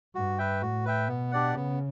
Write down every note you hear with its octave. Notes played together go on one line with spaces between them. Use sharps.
G2 F#4
B4 E5 G5
A2 F#4
B4 E5 G5
B2 B3
D4 G4 D5 F#5
C#3 B3